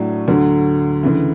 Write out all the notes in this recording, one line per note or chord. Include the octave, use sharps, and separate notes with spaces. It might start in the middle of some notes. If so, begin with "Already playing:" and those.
Already playing: A2 F#3 A3 D4
D2 D3 F#3
D2 C#3 E3